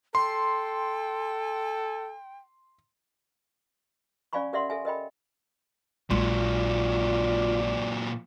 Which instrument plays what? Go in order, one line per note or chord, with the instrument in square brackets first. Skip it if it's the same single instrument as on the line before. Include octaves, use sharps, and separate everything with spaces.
[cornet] A4 [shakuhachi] G5 [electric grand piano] C6
[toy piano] C#4 D5 F5 G#5 B5 C#6
G4 A#4 D5 E5 F#5 C6
A4 E5 G#5
A#4 D#5 G5 B5
[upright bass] A#1 G#3 [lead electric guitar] A#2 F#3 [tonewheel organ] F4 [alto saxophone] D5